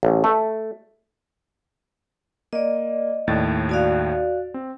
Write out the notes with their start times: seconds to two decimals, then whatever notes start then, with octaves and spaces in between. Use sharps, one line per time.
0.03 A1
0.24 A3
2.53 A#3 D5 D#5
3.27 D#2 A2 A6
3.69 F#4 D5 F5
4.54 C4